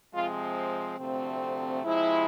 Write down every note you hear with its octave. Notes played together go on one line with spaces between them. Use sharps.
C3 F3 G#3 C4 F4
D2 C3 F3 A3 C4
C3 F3 G#3 E4